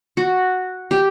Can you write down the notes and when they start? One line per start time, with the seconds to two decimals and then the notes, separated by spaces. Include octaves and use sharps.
0.17 F#4
0.91 G4